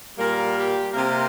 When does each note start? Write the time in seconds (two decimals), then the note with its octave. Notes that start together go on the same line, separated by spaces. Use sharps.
0.18 A#2 G3 A#3 A#4
0.57 G4
0.92 C3 A#3 A#4